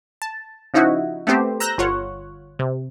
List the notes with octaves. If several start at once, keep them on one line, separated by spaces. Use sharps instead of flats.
A5
C#3 F3 D#4 E4 F#4
A3 B3 C4 G4 C5
A#5 E6 F#6 G6 A#6
G1 F4 C#5 F#5
C3